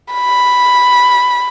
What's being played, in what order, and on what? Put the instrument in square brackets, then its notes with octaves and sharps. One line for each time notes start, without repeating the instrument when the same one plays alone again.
[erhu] B5